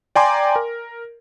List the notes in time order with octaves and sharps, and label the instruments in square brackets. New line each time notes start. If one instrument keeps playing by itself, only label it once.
[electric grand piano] D5 G5 G#5 A#5 C6 D6
A#4